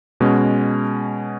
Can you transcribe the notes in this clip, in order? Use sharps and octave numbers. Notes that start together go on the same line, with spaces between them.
B2 G#3 C#4